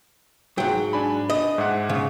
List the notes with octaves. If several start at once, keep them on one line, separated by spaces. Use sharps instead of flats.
G#2 F#3 G5
D4 G#5 B5
D#5
G#2 E5 F#5
C#3